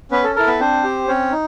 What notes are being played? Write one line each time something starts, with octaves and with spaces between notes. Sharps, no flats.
B3 C#4 B4
A4
E4 A4 A#4
B3 B4
C4 D4 C5
G4
C4 C#4 C#5
D#4